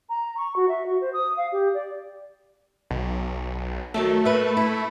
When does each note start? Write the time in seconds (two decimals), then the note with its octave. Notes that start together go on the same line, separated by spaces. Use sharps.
0.09 A#5
0.37 C#6
0.56 F#4
0.69 E5
0.86 F#4
1.01 C5
1.13 D#6
1.37 F5
1.52 G4
1.74 D5
2.91 B1
3.94 D#3 F#3 A3 A4
4.25 A#3 B4 E5
4.57 E4